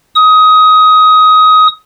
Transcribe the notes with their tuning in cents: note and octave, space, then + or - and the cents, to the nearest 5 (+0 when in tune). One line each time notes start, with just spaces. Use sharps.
D#6 +20